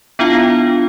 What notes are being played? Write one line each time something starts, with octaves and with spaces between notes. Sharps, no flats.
B3 D4 E4 F4 F5 G5